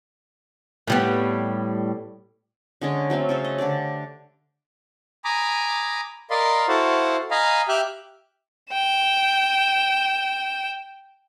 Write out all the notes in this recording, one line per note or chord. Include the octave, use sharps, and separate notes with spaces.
A2 G3 B3
D3 G#3 C#4
F#3 A3 C4 F5
C#3 A4 C5
D#5
D3 D4 G4 D5
G#5 A#5 B5 D6 D#6
A#4 D5 D#5 F5 B5 C6
E4 F#4 A4 C5 F5 F#5
D#5 F5 G#5 A#5 B5
G4 E5 G5 F6 F#6
G5 E7